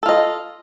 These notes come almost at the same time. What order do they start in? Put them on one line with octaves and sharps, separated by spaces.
A4 F4 D#5